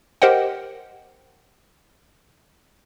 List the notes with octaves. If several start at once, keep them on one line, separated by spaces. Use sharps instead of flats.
G4 A#4 C5 D#5 F#5 G5